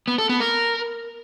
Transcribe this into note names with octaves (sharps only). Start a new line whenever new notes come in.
B3
A4
B3
A#4